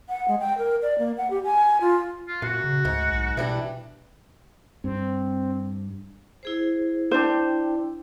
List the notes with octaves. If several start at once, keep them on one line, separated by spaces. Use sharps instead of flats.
F#5
G#3
G5
A#4
D5
A#3
F#5
G4
G#5
F4
F4
F#2 A#2 F#4
C#3
D2 G#2
B1
B2 E3 G3 D4
G2 C4
E4 G#4 C5
D4 E4 C5 G5